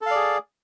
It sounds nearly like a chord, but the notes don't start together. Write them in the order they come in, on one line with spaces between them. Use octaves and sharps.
A4 F5 D5 G#4